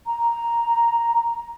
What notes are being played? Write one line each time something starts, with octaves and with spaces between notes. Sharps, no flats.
A#5